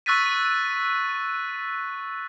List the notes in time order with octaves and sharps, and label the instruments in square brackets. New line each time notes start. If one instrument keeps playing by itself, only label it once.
[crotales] C#6 E6 F#6 A6 B6 D#7